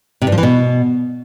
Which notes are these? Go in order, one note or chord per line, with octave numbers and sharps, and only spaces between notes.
C3
G2
F3
E3
B2